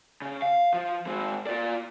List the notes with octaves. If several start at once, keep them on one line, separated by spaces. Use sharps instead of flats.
C#3
F5
F3
G#2 C4
F4 D5